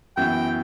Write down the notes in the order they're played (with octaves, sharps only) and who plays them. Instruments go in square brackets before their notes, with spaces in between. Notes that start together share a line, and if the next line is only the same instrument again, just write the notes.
[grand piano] F#2 E3 B3 F#4 [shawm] G5